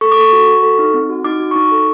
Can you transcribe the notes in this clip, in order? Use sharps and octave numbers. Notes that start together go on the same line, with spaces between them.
A4 C#6
D6
A4 C#6
F#4
F#4
A4
D#4
C4
F#4
D#4 D6
F#4
C#6
D#4 D6
A4